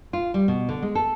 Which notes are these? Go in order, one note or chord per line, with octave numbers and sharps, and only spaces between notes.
F4
G3
B2
D3
G#3
A4